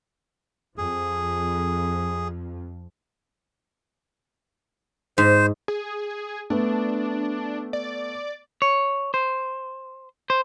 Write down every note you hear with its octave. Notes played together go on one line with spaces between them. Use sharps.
F2 F3 G#4
G#2 C5
G#4
A3 B3 D4
D5
C#5
C5
C5